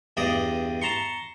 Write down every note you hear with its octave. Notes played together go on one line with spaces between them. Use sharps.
E2 G2 D5 D#5 D#6
A5 A#5 C6 C#6